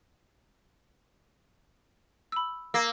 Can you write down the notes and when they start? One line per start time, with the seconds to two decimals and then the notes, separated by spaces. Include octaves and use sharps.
2.32 B5 E6
2.74 A#3 E6 A#6 C7